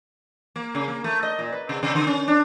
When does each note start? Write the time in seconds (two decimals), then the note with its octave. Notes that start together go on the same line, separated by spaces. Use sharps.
0.56 A#3
0.75 C#3
0.88 A#3
1.04 A3
1.23 D#5
1.39 A#2
1.52 B4
1.69 C3
1.83 C3
1.95 D3
2.07 C#4
2.28 D4